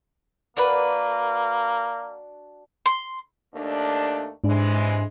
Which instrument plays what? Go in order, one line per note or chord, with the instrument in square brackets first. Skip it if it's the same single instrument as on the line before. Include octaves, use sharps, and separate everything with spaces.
[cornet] A#3 [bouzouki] D4 F#4 [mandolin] A#4 B4
[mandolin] C6
[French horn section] D#2 A3 D4
[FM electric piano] G#2 D4 [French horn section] C3 E3 G#3